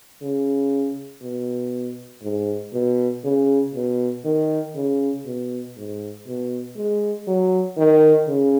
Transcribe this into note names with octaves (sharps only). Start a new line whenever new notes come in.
C#3
B2
G#2
B2
C#3
B2
D#3
C#3
B2
G#2
B2
G#3
F#3
D#3
C#3